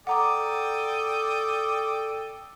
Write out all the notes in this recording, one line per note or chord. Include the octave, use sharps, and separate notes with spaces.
A4 D5 F#5 G5 A#5 D6 D#6